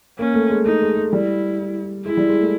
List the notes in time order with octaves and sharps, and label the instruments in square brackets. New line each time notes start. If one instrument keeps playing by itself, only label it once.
[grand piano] A#3 [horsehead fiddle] C#4
[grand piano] A3
G#3
[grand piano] A3 [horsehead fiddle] D#4
[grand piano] G#3
G#3
[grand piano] G3 [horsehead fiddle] E4
[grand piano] G#3 [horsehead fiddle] E4
[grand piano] G3
G#3
A3